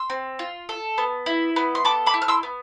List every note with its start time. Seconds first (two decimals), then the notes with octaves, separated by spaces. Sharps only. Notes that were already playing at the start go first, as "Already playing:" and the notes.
Already playing: C6 E6
0.10 C4
0.39 F4
0.69 A4
0.98 B3
1.26 E4
1.56 B3
1.75 C6
1.85 A4 B5 D6
2.06 B5 D6
2.14 E4
2.22 F6
2.28 C6 E6
2.43 B3